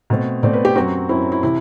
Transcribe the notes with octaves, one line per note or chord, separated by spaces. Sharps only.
B2 A3 C4
B2 A3 C4 D5
B4
G4
F#2 F#3 C4 F#4
F#2 F#3 C4 E4
E4
C3 E3 E4